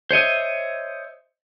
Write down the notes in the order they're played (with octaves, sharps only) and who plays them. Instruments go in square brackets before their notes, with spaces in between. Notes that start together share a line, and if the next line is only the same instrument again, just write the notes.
[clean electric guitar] C5 C#5 D#5 E5